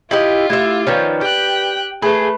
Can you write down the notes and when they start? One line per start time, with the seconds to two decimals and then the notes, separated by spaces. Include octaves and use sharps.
0.11 E4 F4 G4 D#5
0.50 A3 E4 G4 E5
0.87 D#3 F3 C#4 B4 D5
1.21 G4 G5 F#6
2.02 A3 G#4 B4 B5